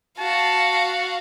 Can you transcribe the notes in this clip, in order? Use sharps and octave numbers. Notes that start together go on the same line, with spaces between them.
F#4 F5 A5